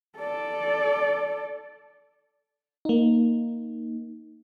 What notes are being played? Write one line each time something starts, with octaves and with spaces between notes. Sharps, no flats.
A4 D5
A#3 D#4